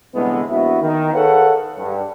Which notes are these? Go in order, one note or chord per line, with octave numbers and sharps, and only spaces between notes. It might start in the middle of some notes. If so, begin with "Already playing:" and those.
C2 A2 D3 E3 G#3 B3
A#1 B3 E4 F#4 E5
D#3
G#4 A4 B4 C#5 F5 F#5
G2